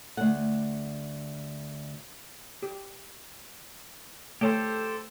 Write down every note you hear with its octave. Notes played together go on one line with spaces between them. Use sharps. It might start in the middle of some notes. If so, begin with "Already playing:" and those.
D2 F#5
G4
A3 G4 A4 C5 C#5 G5